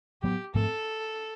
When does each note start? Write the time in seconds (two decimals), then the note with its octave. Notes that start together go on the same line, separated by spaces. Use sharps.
0.23 A2 F#3 B3 G4
0.54 G#2 F3 A3 C4 A4